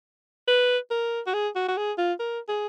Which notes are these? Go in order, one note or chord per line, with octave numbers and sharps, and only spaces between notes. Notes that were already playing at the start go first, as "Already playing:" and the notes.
B4
A#4
F#4
G#4
F#4
F#4
G#4
F4
A#4
G#4